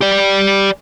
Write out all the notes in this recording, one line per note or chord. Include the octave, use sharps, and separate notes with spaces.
G4 D5